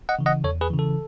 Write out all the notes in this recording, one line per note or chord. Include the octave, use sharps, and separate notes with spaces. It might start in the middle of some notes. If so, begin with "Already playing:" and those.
D#5 F#5
C#3 E3
D#5 F#5
E2 A4 C#5
G#4 B4
C#3 E3
A4